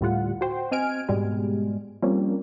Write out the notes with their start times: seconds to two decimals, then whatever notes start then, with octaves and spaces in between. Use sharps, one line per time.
0.01 D2 A2 G3 F4 F#5
0.41 F#4 C5 G5
0.72 C4 D#5 G#5 F6 D7
1.08 G#2 B2 G3 G#3
2.02 F3 G3 A#3 C4 C#4